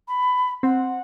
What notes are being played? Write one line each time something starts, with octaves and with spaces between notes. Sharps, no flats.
B5
C4 F#5